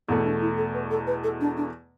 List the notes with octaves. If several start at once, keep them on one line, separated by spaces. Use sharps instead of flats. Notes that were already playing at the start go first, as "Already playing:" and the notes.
E2 B2 A3 B3
D4
E4
A4
B4
A4
B4
A4
D4
D4